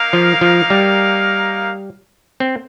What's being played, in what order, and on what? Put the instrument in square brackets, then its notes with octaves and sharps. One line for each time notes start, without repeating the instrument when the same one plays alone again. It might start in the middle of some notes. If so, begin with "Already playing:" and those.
Already playing: [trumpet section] A#3 D#4 A#4 F5
[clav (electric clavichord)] F3
F3
G3
C4